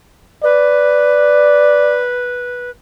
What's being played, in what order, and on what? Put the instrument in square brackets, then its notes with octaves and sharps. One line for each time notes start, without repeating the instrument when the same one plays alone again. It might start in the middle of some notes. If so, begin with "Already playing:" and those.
[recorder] B4 [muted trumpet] D5